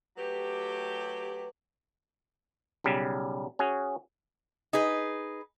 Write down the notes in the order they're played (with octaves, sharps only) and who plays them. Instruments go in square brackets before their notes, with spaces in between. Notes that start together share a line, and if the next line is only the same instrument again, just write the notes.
[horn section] F#3 A3 G4 [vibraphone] B4
[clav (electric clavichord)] B1 C#3 G3
C#4 F#4 G#4
[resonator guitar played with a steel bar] D#4 G#4 B4